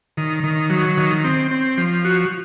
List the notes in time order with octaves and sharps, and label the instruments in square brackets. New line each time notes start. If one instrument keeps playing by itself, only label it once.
[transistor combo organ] D#3
D#3
F#3
D#3
C4
C4
F3
F#4